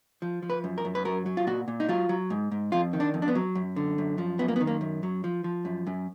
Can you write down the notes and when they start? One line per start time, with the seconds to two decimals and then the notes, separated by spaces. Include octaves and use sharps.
0.22 F3
0.43 F3
0.50 B4
0.64 F#2
0.78 A#4
0.85 F#2
0.95 B4
1.05 F#3 A#4
1.26 F#3
1.37 F4
1.47 A#2 F#4
1.68 A#2
1.80 D#4
1.89 F#3 F4
2.09 F#3
2.30 G#2
2.52 G#2
2.72 F2 F4
2.93 D#3
3.00 D4
3.14 F2
3.22 D4
3.28 B3
3.35 F#3
3.55 F#2
3.76 D3
3.98 F#2
4.18 F3
4.39 F#2 B3
4.48 A#3
4.56 B3
4.60 D#3
4.67 A#3
4.81 F#2
5.03 F#3
5.24 F3
5.44 F3
5.65 F#2
5.87 F#2